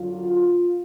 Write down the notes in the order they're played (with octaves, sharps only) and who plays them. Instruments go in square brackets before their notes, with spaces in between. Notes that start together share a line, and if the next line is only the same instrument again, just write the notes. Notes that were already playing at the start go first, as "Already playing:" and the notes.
Already playing: [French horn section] F#2 D3 F#3 F4